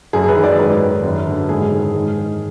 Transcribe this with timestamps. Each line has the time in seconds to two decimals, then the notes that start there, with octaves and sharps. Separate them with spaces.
0.13 F#2 G#4
0.29 B4
0.36 D#3
0.44 D5
0.58 G#2 B4
0.81 D#3
1.04 F#2
1.27 D3
1.49 G#2 G#4
1.72 D#3
1.94 G#2
2.17 D#3